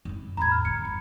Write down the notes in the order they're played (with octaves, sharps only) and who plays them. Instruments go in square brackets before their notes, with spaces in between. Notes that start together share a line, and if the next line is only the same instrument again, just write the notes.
[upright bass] F#2 E4
[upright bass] E2 A2 [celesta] A#5 B5 G#6
[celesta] F6
[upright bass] D3 [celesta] C#7
[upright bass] G1